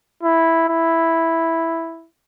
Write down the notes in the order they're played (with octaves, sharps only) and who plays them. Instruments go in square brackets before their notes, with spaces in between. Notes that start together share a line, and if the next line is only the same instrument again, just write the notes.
[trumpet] E4
E4